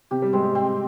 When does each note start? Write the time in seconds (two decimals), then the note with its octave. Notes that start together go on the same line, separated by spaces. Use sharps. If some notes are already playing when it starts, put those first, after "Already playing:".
0.11 C3 G4
0.22 G3
0.33 G#3 C4
0.43 G3
0.55 C4